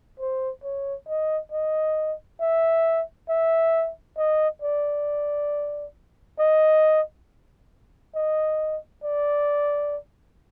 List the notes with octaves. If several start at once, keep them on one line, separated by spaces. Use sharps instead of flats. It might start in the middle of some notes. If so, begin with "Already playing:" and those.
C5
C#5
D#5
D#5
E5
E5
D#5
D5
D#5
D#5
D5